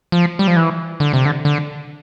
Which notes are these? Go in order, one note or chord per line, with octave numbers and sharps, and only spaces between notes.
F3
G3
F3
E3
D3
C3
D3
D3